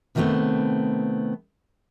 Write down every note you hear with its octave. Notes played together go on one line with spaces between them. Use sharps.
C3 D#3 G3 A3 B3 C4